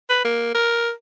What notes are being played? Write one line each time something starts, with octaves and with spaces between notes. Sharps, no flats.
B4
A#3
A#4